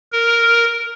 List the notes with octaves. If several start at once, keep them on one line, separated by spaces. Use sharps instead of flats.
A#4